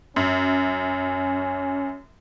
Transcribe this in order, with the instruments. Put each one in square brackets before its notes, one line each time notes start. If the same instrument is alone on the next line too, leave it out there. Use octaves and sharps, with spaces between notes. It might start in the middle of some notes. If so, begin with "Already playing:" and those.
[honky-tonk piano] F#2 [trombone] C#4